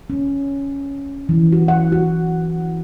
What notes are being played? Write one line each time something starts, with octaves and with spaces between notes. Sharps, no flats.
C#4
E3
F#4
F#5
F#4